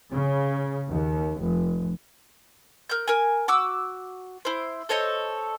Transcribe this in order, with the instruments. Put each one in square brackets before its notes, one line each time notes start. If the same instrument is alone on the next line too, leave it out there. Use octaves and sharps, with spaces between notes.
[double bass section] C#3
D#2
F1
[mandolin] A#4 G6
A#4 G#5
F#4 D6 E6
E4 C5
A4 C5 C#5 D#5